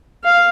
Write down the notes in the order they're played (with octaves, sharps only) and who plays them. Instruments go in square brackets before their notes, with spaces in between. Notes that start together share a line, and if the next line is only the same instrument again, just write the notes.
[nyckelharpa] F5